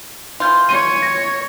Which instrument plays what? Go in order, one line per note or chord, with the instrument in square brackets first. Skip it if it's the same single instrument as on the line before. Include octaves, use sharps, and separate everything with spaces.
[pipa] E3 F4 [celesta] C6 G6
[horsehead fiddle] C#5 [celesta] D#7
[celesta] G#6 A#6